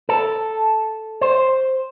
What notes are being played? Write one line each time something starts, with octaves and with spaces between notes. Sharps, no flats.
A4
C5